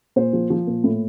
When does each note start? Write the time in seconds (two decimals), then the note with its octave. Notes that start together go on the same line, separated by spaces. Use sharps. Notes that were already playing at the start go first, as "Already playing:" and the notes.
0.16 A#2 C5
0.33 F3
0.50 F3
0.67 A#2
0.84 A2